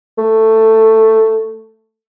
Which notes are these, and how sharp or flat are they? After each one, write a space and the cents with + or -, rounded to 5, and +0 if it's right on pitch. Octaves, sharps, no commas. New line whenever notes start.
A3 +10